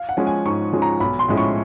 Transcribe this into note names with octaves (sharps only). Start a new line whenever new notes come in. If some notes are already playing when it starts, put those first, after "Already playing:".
Already playing: F5
F#5
F3 G#3 C#4
G#5
G#2 C#6
F3 G#3 C#4
A#5
B1 B5
C6
A2 F3 G#3 C#4
C#6